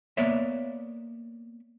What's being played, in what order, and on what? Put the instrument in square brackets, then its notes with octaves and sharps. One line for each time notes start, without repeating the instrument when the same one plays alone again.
[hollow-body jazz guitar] A#3 B3 C#5 D5 E5